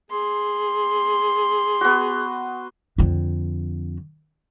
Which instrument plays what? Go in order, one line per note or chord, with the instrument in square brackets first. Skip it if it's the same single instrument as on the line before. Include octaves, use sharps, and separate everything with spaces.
[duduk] G#4 [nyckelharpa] C6
[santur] B3 F#4
[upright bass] F2 D3